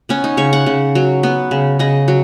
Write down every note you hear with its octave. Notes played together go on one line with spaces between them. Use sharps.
B3 C#4
D#4
C#3 C#5
F#5
C#3
F#3
B3
C#3
C#3 D#5
F#3